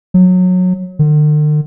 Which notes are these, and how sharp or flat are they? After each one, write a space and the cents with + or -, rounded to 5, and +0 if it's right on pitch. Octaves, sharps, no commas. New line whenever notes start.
F#3 -20
D3 +45